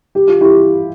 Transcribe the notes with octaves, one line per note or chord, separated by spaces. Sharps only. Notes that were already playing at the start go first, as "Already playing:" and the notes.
G4
F4
E4 G4